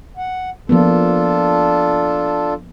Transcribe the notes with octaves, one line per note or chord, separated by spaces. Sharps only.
F#5
F3 A#3 B3 D4 F4 A4